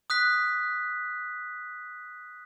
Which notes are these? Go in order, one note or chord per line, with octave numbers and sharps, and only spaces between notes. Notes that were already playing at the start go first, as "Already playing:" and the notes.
D#6 F#6 B6